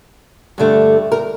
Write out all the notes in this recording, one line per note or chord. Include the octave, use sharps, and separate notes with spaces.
G2 D3 A3
A#4